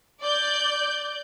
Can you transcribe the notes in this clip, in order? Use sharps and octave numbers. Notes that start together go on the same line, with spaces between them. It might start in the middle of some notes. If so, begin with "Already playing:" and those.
D5 G6